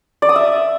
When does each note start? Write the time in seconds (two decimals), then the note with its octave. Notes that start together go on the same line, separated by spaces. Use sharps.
0.22 D5
0.29 D#6
0.36 E5